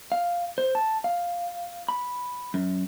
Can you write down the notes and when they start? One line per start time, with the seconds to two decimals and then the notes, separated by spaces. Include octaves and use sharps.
0.12 F5
0.58 C5
0.75 A5
1.04 F5
1.89 B5
2.54 F#2